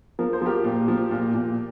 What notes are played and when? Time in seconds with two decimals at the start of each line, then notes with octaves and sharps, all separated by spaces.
0.19 F3 A#4
0.33 C5
0.42 F3 G4 A#4
0.64 A#2
0.88 F3
1.11 A#2
1.34 A#2